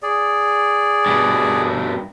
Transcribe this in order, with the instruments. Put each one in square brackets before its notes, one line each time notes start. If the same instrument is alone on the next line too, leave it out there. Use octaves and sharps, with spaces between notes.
[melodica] G#4 D5
[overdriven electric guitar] G2 B2